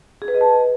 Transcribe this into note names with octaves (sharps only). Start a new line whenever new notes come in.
G#4
B4
D#5
A5